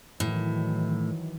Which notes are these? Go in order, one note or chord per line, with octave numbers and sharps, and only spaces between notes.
A2 D#3 E3 F#3